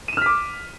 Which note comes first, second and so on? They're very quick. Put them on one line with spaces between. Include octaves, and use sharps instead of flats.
D#7 E7 F6 B6 D6